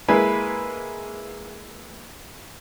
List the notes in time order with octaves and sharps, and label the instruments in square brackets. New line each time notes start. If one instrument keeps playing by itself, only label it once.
[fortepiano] G#3 A#3 E4 B4 G#5